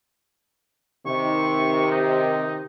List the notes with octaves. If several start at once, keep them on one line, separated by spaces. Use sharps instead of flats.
C3 D#3 C#6
D#4